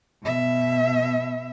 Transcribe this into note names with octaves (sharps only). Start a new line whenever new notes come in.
B2 E5